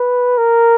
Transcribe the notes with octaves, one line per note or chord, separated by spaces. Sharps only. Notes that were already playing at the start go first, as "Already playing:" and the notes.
Already playing: B4
A#4